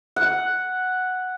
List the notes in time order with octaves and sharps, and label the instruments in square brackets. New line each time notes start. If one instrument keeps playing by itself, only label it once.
[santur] F#5